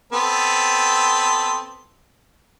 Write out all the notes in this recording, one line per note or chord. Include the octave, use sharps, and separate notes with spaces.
B3 C4 A4